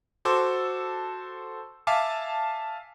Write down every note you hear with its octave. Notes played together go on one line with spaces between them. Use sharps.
F#4 A4 C5 D6 E6
E5 F5 G#5 A5 D6